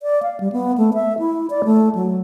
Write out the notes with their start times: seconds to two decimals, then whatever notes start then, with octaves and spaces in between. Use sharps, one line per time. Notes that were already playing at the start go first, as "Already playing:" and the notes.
0.03 D5
0.23 F5
0.40 G3
0.52 B3
0.78 A3
0.94 E5
1.19 E4
1.50 D5
1.65 A3
1.95 F#3